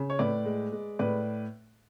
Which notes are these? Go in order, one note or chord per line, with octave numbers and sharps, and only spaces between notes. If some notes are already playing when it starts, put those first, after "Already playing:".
Already playing: C#3
C#5
A2 B4 D5
G#3
G#3
A2 B4 D5